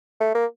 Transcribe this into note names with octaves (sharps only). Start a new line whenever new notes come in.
A3
A#3